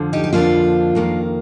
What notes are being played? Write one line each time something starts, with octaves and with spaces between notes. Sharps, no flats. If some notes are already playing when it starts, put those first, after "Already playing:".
Already playing: F2 D3 F3
D#4 G4
G4
F2 D3 F3 A#3 D4 F4
F2 D#3 A#3